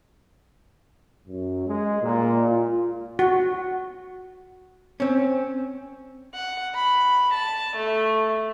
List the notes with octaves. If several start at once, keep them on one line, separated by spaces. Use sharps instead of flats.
F#2
G#3
A#2
F4
F#4
C4 C#4
F#5
B5
A5
A3